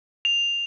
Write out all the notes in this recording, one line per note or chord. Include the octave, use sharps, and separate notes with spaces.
F7